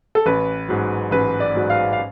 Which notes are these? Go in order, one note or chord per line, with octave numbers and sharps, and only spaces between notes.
A4
A1 B4
G#2 F#3
A1 B4
D5
G#2 F#3
F5
F5